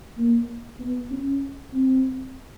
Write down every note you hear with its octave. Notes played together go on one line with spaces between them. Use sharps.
A#3
B3
C#4
C4